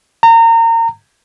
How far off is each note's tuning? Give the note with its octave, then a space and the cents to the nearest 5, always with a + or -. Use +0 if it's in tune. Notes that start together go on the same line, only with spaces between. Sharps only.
A#5 -30